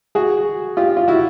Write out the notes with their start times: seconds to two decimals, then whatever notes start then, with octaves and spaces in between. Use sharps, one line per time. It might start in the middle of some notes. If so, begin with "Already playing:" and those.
0.15 F#4 G#4
0.77 F4 G4
0.97 F4
1.08 E4 F#4